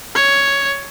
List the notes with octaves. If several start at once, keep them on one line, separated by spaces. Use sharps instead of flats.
C#5